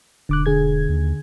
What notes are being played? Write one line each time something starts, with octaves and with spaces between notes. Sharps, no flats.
E1 D3 D6 F#6
D3 G#4 G#6
D#2